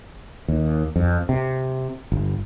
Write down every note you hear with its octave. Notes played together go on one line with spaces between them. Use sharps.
D#2
F2
C3
G1